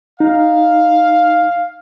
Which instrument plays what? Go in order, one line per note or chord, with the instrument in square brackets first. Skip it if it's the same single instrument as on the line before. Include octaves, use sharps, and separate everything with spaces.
[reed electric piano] D#4 [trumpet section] F5